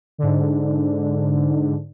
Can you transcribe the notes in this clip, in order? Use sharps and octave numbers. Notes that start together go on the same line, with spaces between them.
G#2 D3